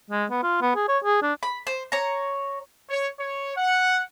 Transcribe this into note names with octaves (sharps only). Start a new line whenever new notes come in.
G#3
B3
F4
B3
G#4
C#5
G#4
D4
B5
C5
C#5 A#5
C#5
C#5
F#5